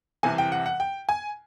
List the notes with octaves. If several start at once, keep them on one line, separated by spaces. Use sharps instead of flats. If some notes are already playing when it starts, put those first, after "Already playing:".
C2 C3 E3 G#5
G5
F#5
F#5
G5
G#5